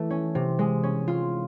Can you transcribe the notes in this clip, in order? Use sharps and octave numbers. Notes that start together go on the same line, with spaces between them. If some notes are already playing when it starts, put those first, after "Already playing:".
Already playing: E3 A3
C#4
C3
G#3
C#4
F4